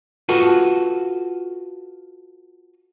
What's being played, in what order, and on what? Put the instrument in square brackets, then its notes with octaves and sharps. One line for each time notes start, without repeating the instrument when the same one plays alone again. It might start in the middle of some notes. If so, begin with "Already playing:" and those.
[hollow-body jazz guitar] F4 F#4 A4 B4